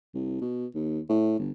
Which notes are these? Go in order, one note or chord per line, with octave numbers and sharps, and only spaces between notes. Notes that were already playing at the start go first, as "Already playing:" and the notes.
C2
B2
D#2
A2
G1